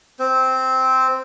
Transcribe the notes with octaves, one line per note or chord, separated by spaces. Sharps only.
C4 C5